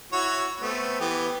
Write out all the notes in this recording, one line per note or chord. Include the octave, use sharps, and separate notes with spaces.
E4 F#4 C#5
A3 B3 C4
E3 B3 G4